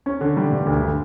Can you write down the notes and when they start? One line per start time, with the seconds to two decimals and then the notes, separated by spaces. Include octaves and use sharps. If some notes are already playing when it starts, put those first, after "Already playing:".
0.06 C#4
0.21 D3
0.37 G3
0.52 G2
0.67 D2
0.82 D3